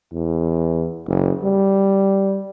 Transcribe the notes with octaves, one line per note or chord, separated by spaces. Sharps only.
E2
F#1
G3